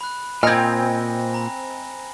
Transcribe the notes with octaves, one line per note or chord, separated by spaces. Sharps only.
B5 F#6
A#2 C4 D#5 G#5 F6 G#6 A#6
A#5 B5